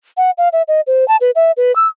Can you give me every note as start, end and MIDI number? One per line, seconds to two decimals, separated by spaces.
0.17 0.31 78
0.38 0.49 77
0.53 0.62 76
0.68 0.81 75
0.87 1.07 72
1.08 1.17 81
1.21 1.31 71
1.36 1.52 76
1.57 1.74 71
1.76 1.87 88